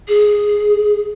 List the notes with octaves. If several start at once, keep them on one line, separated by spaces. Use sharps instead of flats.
G#4